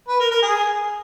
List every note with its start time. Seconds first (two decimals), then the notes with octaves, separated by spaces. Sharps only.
0.08 B4
0.20 A#4
0.31 A#4
0.42 G#4